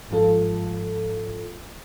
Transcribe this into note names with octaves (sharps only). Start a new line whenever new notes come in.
G1 G#2 F3 F4 A4